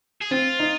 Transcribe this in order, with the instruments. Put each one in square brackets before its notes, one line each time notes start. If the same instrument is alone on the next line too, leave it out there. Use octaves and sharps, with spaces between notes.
[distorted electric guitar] G#4
[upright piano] C4 [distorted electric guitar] F4
[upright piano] D#4